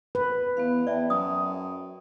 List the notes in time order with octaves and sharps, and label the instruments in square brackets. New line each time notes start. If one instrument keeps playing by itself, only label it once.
[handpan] B4
[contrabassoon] E2 [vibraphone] B3 F5
[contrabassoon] E2 [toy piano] D5 E5 [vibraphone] G5 A5
[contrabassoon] F#2 [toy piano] D#6